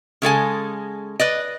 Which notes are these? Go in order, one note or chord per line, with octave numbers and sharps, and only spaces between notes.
C#3 G#3 A4 G#5
B4 D5 D#5